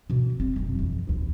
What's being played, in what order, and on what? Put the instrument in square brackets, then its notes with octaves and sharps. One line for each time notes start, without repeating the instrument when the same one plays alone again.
[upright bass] B2 E3
G#3 C4
F1 F#2
F2 E3
A#1 D#2